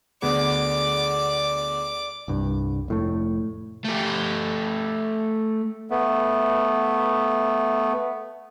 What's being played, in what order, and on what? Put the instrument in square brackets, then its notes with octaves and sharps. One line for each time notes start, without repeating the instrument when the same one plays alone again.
[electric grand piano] D2 B3 G#4 [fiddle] D5 D6
[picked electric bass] C2 G2
F1 A2 A3
[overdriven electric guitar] A3 G4
[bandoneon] A3 B3